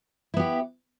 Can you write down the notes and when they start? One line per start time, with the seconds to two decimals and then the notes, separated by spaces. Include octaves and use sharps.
0.34 E4
0.37 B3
0.40 G4